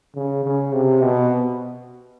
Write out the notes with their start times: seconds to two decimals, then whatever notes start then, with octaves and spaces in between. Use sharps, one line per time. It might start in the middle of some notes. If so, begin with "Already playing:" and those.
0.15 C#3
0.44 C#3
0.73 C3
1.02 B2